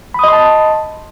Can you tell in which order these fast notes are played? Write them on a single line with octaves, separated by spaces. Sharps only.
B5 D#6 D#5 C6 A5